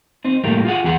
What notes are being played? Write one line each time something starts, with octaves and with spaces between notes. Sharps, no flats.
C4 D#4
A2 G3 A3 A#3
F4 G#4 F#5
E2 G#4 F#5